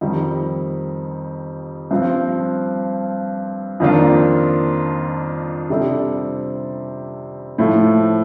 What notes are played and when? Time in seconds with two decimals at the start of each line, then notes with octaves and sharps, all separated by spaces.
0.01 F2 D#3 G3
1.91 G2 F3 C4
3.80 F2 D#3 A#3 D4 F4
5.70 C3 G3 D4 A4 D5
7.58 A2 F3 A3